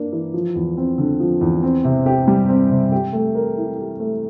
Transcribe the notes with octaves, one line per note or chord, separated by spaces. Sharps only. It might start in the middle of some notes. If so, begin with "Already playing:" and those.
Already playing: A#3 D4
E3
F3
E2
C4
D3
F3
E2
C4
C3
G4
G3
C4
C3
G4
A3
A#4
E4
G4
A3